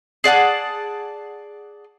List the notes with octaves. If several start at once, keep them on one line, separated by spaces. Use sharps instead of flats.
G#4 D5 F#5 A5